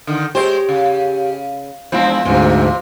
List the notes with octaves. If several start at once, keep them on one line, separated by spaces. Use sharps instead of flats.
D3 D#3
G#3 G4 C5 C#5 D#5
C#3
E2 F3 G#3 C4 D4 E4
D2 G#2 C3 F3 C#4